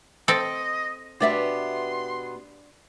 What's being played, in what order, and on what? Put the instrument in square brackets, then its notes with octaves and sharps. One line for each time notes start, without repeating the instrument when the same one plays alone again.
[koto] C4 A4 [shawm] D#5
[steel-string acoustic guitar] B2 B3 G4 [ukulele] D4 D5 E5 [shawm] C6